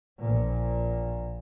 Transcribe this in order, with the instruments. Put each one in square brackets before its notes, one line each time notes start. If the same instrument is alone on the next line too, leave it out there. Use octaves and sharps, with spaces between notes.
[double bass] A#1 A#2